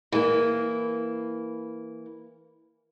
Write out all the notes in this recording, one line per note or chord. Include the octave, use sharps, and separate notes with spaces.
E3 A#3